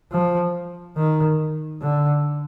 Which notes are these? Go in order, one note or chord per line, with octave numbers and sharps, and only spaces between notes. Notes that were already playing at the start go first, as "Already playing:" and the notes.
F3
D#3
D3